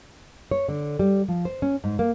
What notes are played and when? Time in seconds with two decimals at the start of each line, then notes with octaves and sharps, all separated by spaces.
0.51 C#5
0.68 D3
0.99 G3
1.28 F3
1.45 C5
1.62 C#4
1.84 G#2
1.99 A#3